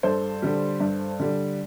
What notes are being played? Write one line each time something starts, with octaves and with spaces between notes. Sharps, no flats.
G2 A4 C5
D3 G3
G2
D3 G3